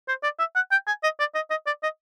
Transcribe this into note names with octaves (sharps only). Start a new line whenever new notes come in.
C5
D5
E5
F#5
G5
G#5
D#5
D5
D#5
D#5
D5
D#5